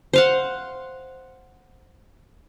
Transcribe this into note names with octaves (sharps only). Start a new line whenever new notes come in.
C5 F5 F#5